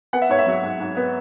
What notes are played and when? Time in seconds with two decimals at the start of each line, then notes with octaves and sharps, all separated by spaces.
0.13 B3 F#5
0.22 E5
0.29 G#2 C#5
0.39 E5
0.47 F#3
0.63 G#2
0.80 G#2
0.97 B3